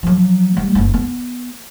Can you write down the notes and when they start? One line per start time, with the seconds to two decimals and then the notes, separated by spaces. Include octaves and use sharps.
0.03 F3 F#3
0.57 G3 G#3
0.75 F#1 E4
0.94 B3